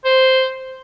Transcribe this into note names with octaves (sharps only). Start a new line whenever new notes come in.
C5